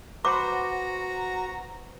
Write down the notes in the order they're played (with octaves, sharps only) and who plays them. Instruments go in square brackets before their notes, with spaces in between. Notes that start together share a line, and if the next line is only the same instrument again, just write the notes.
[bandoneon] F#4 [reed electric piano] B4 C5 F#5 [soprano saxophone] A#5 [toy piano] D6